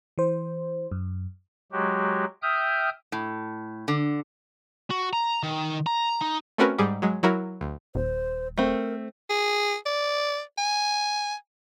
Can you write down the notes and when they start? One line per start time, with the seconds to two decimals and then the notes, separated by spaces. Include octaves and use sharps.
0.18 E3 C5
0.91 F#2
1.72 F#3 G#3 F#4 G4
2.43 E5 G5 D#6 F6 G6
3.12 A2
3.88 D3
4.91 F#4
5.13 A#5
5.43 D#3
5.87 A#5
6.22 D#4
6.58 A3 C4 C#4 F#4 A#4 B4
6.78 G#2 G3 G#4
7.02 F#3 G#3
7.23 F#3 E4 F#4 A#4
7.61 D2
7.95 D#1 C5
8.58 A3 C4 A#4
9.30 G#4
9.86 D5
10.58 G#5